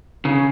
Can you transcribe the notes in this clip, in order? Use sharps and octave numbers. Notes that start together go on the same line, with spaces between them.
C#3